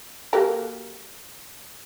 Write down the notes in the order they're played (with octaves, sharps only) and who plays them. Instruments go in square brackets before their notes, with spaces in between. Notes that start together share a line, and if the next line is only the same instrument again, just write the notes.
[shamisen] F#3 A4 [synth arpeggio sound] A#3 G4 A#4